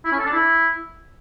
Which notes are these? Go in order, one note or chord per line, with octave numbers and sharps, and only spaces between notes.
E4
C#4
A4
D4
E4